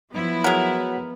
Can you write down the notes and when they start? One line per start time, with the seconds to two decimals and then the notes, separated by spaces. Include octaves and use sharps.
0.13 F3 F#3 B3 E4
0.44 G#3 F#4 A#4 C#5 F#5